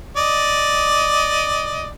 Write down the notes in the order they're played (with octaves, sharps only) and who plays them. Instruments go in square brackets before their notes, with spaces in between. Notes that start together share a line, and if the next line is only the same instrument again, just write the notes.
[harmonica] D5 D#5